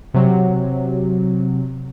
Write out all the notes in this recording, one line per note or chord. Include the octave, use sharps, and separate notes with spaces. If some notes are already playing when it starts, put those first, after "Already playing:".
C3 F#3